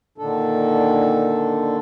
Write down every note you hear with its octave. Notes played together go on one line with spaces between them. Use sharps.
A#2 D3 D#3 D4 A4